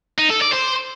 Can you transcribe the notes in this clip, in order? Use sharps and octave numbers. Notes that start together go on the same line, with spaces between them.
D#4
A4
D5
C5